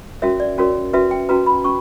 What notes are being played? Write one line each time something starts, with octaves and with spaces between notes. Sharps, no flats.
C#4 F#4 A#4 C#5 E5
D5
C#4 F#4 A#4 C#5
C#4 F#4 B4 E5
G5
C#4 F#4 B4 A#5
B5
C#4 C#6